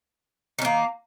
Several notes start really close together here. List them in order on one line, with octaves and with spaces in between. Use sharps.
D#3 C#4 A#3